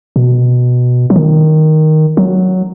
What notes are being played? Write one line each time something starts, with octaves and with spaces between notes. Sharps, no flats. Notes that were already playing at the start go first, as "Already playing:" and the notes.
B2
F#3
D#3
F#3